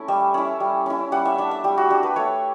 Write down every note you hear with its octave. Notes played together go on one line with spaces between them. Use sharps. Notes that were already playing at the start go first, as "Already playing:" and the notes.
Already playing: A3 C#4 E4
G3 E5
C#4 E4
G3
C#4 E4
G3 F#5
E5
D4 E5
E5
G3 G4
F#4
D4 G4
B4
A3 C#5